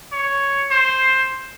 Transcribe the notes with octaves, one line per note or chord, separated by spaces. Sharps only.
C#5
C5